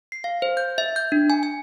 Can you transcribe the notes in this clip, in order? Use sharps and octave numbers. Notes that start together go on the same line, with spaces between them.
C7
F5
C5
G6
E5
G6
D4
G#5
G#5